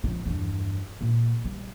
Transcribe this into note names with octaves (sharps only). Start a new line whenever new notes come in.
F2 C#3
E2 G2
A#2
G3